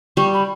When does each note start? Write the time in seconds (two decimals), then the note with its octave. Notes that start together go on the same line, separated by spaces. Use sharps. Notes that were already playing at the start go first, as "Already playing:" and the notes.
0.17 G3 C#6
0.33 B5